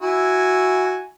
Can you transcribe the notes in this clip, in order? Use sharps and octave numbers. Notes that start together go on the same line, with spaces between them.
E4 F#4 G#5